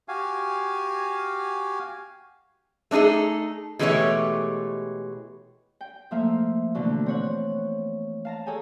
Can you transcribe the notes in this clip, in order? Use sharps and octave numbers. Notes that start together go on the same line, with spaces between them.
F#4 G4 F5 G#5
A3 D4 D#4 G#4 A4
B2 E3 G#3 A3 G4 C#5
G5
F3 A3 A#3 E5 F5
B2 D3 E3 A3 A#3
C4 C#5 F#5
F5 A5 A#5
G#4 A4 C#5 G5 G#5